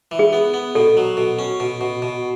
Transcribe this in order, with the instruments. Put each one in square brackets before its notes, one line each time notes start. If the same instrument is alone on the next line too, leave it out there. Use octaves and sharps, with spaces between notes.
[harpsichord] E3
[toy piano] G#4
[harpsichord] B3
B3
[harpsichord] B2 [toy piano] A4
[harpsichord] F#3
B2
C#4
B2
B2
B2